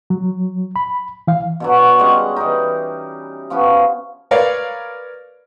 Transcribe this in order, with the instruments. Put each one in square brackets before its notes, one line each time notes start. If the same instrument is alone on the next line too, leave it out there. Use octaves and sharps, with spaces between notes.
[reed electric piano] F#3
B5
E3 F5
[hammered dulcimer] B2 D3 F#3
G3 G#3 C#4 F#5
E3 G3 D#4
F3 B3 C#4 E4
[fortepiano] A#4 B4 C#5 D5 F5